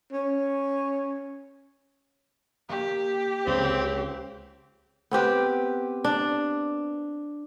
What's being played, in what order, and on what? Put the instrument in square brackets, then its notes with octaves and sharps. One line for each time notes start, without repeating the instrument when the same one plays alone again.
[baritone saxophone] C#4
[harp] A#3 [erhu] G4
[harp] C#2 [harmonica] C4
[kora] B3 C4 G4 B4
D4